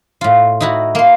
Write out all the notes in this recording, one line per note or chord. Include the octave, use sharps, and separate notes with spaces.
A2 F4
D#4 E4 F#4
A#3 C6